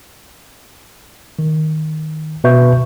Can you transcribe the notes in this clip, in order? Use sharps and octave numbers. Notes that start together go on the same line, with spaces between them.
D#3
B2 B4 E5 C#6 G6